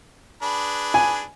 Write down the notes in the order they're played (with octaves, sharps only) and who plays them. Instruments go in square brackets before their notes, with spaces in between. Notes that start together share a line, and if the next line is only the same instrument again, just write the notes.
[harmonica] D4 G#4 B4
[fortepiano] G#5